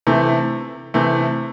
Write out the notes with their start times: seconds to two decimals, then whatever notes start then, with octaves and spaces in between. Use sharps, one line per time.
0.07 C3 E3 A3
0.94 C3 E3 A3